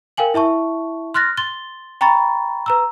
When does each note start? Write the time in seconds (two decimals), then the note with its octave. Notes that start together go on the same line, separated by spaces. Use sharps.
0.17 A#4 F5 G5 G#5 F#7
0.34 E4 E5 A5 C#6
1.14 C6 F6 F#6 A6 A#6
1.37 C6 A6 G7
2.01 G5 A#5 B5 C#6 A6
2.66 B4 A#5 E6